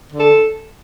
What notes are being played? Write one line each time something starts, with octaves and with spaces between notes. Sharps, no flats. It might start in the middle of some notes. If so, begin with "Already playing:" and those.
D3
A4